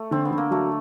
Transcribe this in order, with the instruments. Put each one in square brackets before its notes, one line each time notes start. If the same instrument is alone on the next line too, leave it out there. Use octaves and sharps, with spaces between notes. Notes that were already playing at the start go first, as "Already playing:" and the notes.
Already playing: [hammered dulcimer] A3
[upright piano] D3 [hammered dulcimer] C4
[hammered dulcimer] B3
[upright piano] D3
[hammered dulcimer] A#3
[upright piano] F#3 [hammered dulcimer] A3